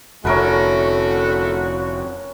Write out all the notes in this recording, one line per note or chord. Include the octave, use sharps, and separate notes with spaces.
F1 D3 A3 C#4 E4 F#4 A#4 B4